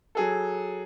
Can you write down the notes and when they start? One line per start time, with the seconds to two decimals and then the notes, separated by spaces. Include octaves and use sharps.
0.15 F#3 G#4 A4